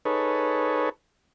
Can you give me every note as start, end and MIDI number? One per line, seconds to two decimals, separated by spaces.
0.05 0.89 63
0.05 0.89 68
0.05 0.89 69
0.05 0.89 71
0.05 0.89 73